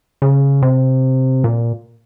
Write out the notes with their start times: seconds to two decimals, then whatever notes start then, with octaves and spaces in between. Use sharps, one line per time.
0.22 C#3
0.62 C3
1.44 A#2